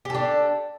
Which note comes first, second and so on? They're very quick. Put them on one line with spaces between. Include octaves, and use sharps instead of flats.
G4 A4 D4